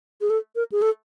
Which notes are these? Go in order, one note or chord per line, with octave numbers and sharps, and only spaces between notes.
G#4
A4
A#4
G#4
A4